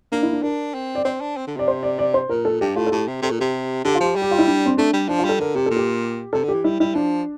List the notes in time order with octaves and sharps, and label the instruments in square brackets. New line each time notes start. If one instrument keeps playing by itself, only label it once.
[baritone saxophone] A#3 [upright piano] D4
[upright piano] E4
D4
[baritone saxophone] D4 [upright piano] A#4
[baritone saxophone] C4
[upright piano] D5
[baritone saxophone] C4 [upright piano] C5
[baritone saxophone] D4
C4
D3
[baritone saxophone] C3 [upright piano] D5
[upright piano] C5
D5
D5
C5
[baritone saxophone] A#2 [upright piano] A#4
[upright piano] A4
[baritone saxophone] G2 [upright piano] G4
[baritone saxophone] A2 [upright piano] F4
[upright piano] A4
[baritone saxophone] A2 [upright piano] G4
[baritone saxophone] C3
[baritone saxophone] C3 [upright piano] A4
[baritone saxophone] A#2
[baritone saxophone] C3 [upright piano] G4
[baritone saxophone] D3 [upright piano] G4
[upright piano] F4
[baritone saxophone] F3 [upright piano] G4
[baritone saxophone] G3
[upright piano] G4
F4
E4
D4
C4
[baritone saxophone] A3 [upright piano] D4
[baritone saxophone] G3
[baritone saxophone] F3 [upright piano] D4
[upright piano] F4
[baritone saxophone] G3 [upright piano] A4
[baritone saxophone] D3 [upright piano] A#4
[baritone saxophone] C3 [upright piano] G4
[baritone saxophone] A#2 [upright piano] A4
[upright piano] G4
[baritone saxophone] C3 [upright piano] A4
[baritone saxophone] D3
[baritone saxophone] E3 [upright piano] G4
[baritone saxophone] G3 [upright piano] E4
[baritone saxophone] G3 [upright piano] E4
[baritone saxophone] F3 [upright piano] D4